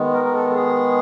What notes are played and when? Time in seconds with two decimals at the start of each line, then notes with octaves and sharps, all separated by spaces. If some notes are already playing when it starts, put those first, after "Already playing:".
Already playing: D#3 G#3 B3
0.13 A#4
0.24 A#4
0.33 A4
0.50 A4
0.54 G#4